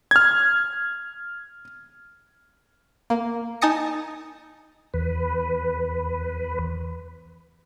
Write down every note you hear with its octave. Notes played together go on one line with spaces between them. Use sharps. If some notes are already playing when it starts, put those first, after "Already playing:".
F6 G#6
A#3
D#4 G#5 A5 D#6 A#6 C#7
E2 B4